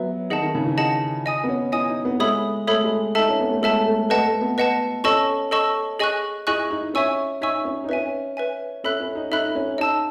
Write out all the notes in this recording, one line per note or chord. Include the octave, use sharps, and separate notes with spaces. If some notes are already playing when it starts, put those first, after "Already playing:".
Already playing: F#3 B3 B4 E5
D#3 G#4 D#5 F#5 A5
D#3
C#3
E3
G#4 D#5 F#5 A5
D#5 G#5 D#6
B3
C#4
E4 D#5 G#5 D#6
D#4
B3
G#3 A4 C#5 E5 B5 D#6
A3 A4 C#5 E5 B5 D#6
G#3
D#4 A4 E5 A5
C#4
B3
A3
G#3 A4 E5 A5
A3
A3 B4 D#5 F#5 A5
A3
B3
B4 D#5 F#5 A5
C#4 A4 D#5 A5 C#6 E6
A4 D#5 A5 C#6 E6
G#4 D#5 G#5 C#6 F#6
E4 G#4 D#5 G#5 C#6 F#6
D#4
C#4 C#5 E5 G#5 C#6 E6
D#4 C#5 E5 G#5 C#6 E6
C#4
D#4
C#4 B4 E5 G#5
B4 E5 G#5
C#4 A4 E5 B5 F#6
C#4
D#4
D#4 A4 E5 B5 F#6
C#4
D#4 D#5 A5 E6